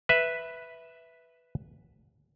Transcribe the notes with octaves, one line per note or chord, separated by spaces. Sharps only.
B4 E5